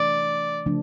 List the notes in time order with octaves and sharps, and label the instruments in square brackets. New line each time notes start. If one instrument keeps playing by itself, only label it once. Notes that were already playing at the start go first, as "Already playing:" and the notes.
Already playing: [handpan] C3 E3 A3 D4 [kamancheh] D5
[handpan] C#3 F3 A3 D4